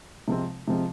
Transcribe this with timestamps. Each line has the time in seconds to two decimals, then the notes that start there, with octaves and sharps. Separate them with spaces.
0.28 C3 F3 G#3 C4
0.68 C3 F3 G#3 C4